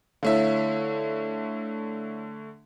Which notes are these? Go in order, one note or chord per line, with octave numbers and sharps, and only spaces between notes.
D3 A3 E4 C#5 E5 F5